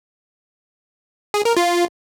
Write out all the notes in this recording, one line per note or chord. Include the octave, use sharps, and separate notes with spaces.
G#4
A#4
F4